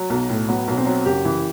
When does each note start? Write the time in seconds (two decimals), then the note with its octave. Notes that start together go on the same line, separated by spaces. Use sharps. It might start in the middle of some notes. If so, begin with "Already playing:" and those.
Already playing: F#3
0.10 B1
0.29 A2
0.48 F#3 B3
0.68 B1
0.77 C4
0.86 F#3
1.05 F#1 G4
1.25 E3